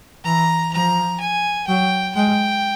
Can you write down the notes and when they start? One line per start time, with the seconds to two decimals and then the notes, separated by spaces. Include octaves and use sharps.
0.25 E3 A#5
0.73 F3 A#5
1.20 G#5
1.67 F#3 G5
2.15 G#3 G5